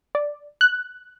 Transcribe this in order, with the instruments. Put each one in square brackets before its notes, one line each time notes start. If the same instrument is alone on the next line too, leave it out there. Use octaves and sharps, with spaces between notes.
[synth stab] D5
F#6